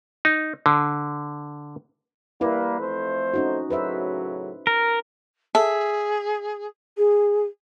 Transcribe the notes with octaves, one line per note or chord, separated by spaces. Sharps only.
D#4
D3
G3 A#3 E4 B4
F2 A3 C5
C#4 D#4 F#4
A2 C#3 F#3 B4 C5 E5
A#4
G#4 A4 E5
G#4